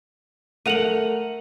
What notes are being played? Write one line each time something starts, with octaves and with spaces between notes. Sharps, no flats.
A3 A#4 F#5 D#7 F7 F#7